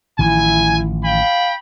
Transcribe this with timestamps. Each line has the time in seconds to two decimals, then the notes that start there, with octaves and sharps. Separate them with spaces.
0.19 A1 D#3 F3 E4 G#5
1.05 F5 G5 B5